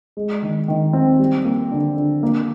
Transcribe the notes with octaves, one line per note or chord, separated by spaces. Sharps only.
G#3
D#3
D#3
C4
G3
A#3
D3
D3
A#3